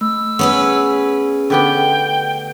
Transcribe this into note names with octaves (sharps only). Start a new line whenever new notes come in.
A3 E6
B3 C#4 G#4 B4
D3 B3 G4 G5